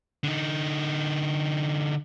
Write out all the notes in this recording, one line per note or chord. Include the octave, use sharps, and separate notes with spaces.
D3 D#4